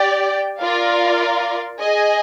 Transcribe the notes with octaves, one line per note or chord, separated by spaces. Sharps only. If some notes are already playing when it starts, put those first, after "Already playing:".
Already playing: G4 D5 G5
F4 A#4 D5 F5
G#4 D#5 G#5